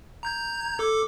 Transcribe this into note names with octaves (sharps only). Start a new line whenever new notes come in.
A#5 G6 G#6
A4 D6